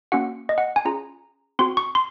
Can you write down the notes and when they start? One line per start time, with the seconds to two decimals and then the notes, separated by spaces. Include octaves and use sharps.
0.12 A#3 C#4 F#4 F#5
0.49 D#5
0.58 F#5
0.76 G#5
0.85 C#4 F4 G#4 A#5
1.59 C4 F#4 C6
1.77 C#6
1.95 C6